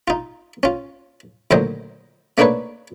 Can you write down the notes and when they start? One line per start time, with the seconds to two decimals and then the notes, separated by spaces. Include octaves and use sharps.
0.08 D#4 F4
0.63 C#4 F4
1.51 D2 A#2 D#3 F#3 C5 D#5
2.38 A3 A#3 D4 D#4 B4 C#5